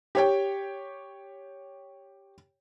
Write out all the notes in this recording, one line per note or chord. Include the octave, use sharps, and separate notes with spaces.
G4 C#5 G5